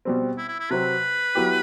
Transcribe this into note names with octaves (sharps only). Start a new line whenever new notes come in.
B2 G3 C4
E4
E4
E4
C3 F#3 C4 B4
F#3 B3 E4 G4